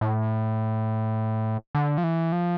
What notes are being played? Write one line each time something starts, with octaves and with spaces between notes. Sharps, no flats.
A2
D3
F3
E3
F3